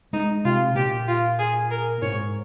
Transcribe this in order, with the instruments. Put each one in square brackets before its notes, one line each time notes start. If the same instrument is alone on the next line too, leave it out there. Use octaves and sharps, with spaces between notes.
[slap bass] G#3 [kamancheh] D#4
[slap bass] C3 [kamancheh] F4
[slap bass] A#2 [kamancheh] G4
[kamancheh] F4
G#4
A#4
[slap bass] G#2 [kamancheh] C#5